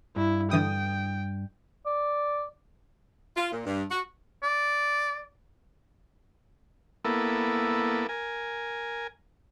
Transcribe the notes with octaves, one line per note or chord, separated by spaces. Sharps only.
G2 E4
D3 E3 G5 D#6
D5
F4
A#2
G2
F#4
D5
A#3 B3 E4 A4
A#4 G#5